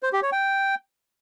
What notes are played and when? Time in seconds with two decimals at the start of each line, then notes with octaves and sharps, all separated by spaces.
0.03 C5
0.13 G4
0.23 C#5
0.32 G5